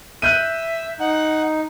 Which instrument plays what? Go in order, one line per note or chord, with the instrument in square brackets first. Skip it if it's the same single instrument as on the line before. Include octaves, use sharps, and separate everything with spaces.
[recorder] E5 [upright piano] F#6 G6 D#7
[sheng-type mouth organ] D#4 [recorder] F#5